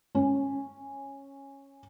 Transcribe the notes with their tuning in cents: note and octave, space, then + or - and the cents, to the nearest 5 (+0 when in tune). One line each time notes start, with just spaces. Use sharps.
C#4 -10